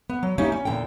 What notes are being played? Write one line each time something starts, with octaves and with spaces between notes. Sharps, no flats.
B3
F#3
G3 A#3 C#4 D#4 E4
C#4
E2 A#2 D3 G5